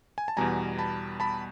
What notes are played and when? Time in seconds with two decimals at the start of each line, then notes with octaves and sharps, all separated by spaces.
0.18 G#5
0.28 A5
0.37 E2 B2 G3 G#5 A#5
0.79 A5 B5
1.20 A5 B5